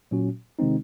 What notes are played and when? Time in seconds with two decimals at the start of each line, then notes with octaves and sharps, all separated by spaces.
0.11 A#2 F#3 C#4 F#4
0.59 C3 D#3 G#3 C4 D#4